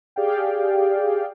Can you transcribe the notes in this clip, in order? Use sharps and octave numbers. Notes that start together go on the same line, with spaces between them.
G4 G#4 D5 F5 G5